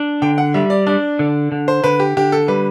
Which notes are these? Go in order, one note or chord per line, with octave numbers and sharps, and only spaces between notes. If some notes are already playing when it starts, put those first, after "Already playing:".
Already playing: D4
D3 G5
F#5
G3 E5
D5
D4 D5
D3
D3
C5
D3 B4
G4
D3 G4
A4
G3 B4